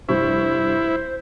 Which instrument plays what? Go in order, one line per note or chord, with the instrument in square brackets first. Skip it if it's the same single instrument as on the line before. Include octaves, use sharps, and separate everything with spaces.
[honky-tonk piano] F1 G2 C#6 [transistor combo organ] E4 [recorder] C5